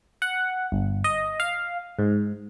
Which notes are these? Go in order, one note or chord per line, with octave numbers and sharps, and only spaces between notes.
F#5
G1
D#5
F5
G#2